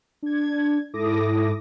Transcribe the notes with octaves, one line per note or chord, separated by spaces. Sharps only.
D4 G#6
G#2 E4 A4 D6 D#6 A#6